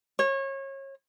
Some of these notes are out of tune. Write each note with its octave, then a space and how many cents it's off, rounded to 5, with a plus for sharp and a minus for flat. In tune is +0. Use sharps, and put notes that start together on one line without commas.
C#5 -30